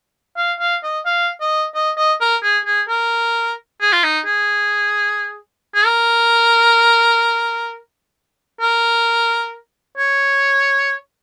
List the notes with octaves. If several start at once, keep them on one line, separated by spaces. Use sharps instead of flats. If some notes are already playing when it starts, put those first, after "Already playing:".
F5
F5
D#5
F5
D#5
D#5
D#5
A#4
G#4
G#4
A#4
G#4
F4
D#4
G#4
G#4
A#4
A#4
C#5